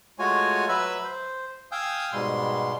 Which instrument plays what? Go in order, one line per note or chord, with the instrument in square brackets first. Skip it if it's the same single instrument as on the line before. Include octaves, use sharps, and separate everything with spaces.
[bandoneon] G#3 A3 F4 F#4 C#5 G#5
F#3 B4 E5 B5 E6
C5
F5 G5 G#5 D#6 E6 G6
G#2 B2 G3 G#3 C6